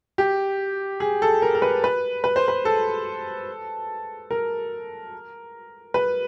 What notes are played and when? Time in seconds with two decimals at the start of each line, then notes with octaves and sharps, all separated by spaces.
0.18 G4
1.00 G#4
1.22 A4
1.42 A#4
1.55 A#4
1.62 B4
1.84 B4
2.24 B4
2.36 C5
2.48 B4
2.65 A4
4.31 A#4
5.94 B4